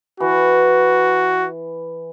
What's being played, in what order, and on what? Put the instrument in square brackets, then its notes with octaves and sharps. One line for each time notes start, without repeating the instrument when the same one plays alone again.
[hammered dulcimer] E3 [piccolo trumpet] F#4